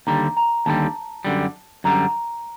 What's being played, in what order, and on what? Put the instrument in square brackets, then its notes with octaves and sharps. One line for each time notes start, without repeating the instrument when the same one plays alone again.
[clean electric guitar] D#2 D3 G3 [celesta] A#5
[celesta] A#5
[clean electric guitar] D#2 D3 G3 [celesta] A5
[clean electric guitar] F#2 D3 G3
[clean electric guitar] F#2 D3 G3 [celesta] A#5